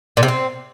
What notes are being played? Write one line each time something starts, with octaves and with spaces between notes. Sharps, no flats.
A#2
C3
C4